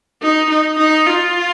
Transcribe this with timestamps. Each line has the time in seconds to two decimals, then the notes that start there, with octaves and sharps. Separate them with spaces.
0.22 D#4
0.50 D#4
0.78 D#4
1.07 F4